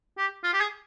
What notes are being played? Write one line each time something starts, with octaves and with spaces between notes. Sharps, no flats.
G4
F4
G4
G#4